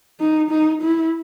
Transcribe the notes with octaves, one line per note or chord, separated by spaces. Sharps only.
D#4
D#4
E4